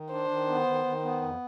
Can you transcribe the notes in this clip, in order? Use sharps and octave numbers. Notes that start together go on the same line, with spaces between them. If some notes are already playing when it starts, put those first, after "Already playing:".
Already playing: D#3
D4 C5
D#3
B3
D#3
D#3
B3
F2